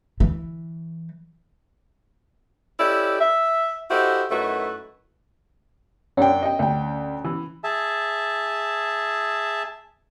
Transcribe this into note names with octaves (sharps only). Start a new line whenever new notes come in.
E3
C#4 E4 G4 A4 D5 D#5
E5
E4 F#4 G4 A4 C5 D#5
F#2 A3 D#4 E4 F#4 B4
F#2 C#4 D4 G5
D#5 G5
D2 G5
E3
G#4 E5 A5